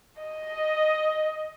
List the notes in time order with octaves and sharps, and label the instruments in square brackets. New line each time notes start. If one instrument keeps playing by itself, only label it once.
[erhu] D#5